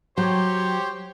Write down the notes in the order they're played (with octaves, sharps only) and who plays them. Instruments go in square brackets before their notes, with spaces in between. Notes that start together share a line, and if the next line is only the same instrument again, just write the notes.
[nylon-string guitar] F#3 [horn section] G4 C5 C#5